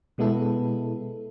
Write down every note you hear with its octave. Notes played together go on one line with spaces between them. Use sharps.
B2 G#3 B3 E4 A4